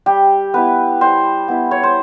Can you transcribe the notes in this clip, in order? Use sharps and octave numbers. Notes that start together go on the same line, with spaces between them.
G3 G4
B3 E4 B4
G3 C5
B3 E4
C#5
C5